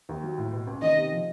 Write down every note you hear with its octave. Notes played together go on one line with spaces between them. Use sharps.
D#2
F#3
A2
B2
C#2
D#3 D#5
C3
F3